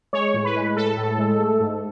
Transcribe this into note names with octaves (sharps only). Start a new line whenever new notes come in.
G#3 C#5
A2
B4
G#3
A2 A4
A2
G#3
A3
G#2